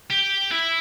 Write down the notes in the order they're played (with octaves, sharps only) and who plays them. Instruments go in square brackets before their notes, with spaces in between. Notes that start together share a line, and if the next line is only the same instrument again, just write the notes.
[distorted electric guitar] G4
E4